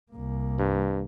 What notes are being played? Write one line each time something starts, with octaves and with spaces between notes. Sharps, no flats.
C2 A#3
G2